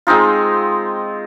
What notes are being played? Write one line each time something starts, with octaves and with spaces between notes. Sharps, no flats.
G#3 C4 D#4 F4